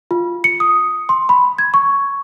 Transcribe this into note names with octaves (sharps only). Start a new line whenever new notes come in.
F4
C#7
D#6
C6
B5
G#6
C#6